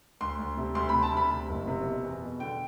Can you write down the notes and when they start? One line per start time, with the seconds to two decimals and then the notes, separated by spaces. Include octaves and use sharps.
0.21 D2 C6
0.39 D2
0.57 C3
0.75 D2 C6
0.89 C3 B5
1.03 A5
1.13 D2 B5
1.31 C3
1.49 F#1
1.68 C3
1.86 B2
2.04 E2
2.22 B2
2.40 D3 G5